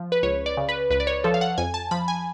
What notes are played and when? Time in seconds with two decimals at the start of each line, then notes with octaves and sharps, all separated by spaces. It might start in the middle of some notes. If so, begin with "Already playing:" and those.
Already playing: F3
0.12 B4
0.23 C#2 C#5
0.46 D5
0.57 C#3
0.69 B4
0.90 C#2 B4
1.00 D5
1.07 C#5
1.24 F3 A4
1.34 F5
1.41 F#5
1.58 F2 G#5
1.74 A5
1.91 F3 B5
2.08 G#5